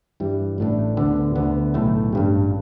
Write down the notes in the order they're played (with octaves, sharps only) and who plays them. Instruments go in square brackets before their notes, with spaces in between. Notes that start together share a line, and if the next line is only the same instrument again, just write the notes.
[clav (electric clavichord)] G2 E3 G3
A1 A2 A3 D4
D2 D3 B3 D4
D2 D3 B3
B1 A2 A3
A1 G2 G3